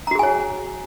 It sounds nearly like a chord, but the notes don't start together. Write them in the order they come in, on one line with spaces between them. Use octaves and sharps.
A#5 F#4 G#4 G#5 C#5